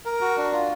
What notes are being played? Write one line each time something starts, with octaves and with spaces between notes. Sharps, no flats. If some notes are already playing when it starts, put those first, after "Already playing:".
A#4
F#4
D4
F4